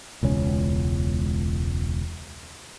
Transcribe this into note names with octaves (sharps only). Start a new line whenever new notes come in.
E1 C#2 C#4